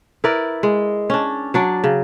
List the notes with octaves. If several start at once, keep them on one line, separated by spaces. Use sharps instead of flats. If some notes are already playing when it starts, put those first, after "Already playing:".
E4 A#4 B4 D5
G#3
C#4 D4
F#3 D4 D5
C#3